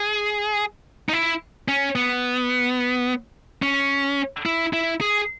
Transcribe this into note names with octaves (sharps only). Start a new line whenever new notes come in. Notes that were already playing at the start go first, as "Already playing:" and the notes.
Already playing: G#4
D#4
E4
C#4
B3
C#4
E4
E4
G#4